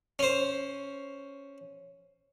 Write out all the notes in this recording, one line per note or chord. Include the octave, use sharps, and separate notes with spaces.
C#4 C5